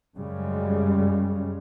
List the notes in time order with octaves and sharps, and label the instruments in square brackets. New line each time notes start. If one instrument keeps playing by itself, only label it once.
[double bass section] F#2 C#3 G3 G#3